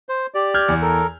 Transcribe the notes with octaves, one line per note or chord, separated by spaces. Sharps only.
C5
G4 D5
F6 G6 G#6
E2
A4 A#4